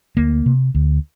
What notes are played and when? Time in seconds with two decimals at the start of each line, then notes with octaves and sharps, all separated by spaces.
0.17 D2 A#3
0.46 C3
0.75 D2